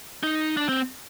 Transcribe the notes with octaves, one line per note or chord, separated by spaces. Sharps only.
D#4
D4
C4